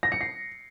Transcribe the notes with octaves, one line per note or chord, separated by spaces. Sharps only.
A#6
C#7
C7